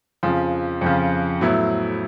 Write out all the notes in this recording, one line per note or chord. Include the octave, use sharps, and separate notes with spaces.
F2 C#3 F3
F2 C#3 F3
A2 F#3 B3 E4